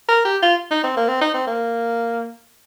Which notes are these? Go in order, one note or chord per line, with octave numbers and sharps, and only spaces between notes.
A#4
G4
F4
D#4
C4
A#3
C4
D#4
C4
A#3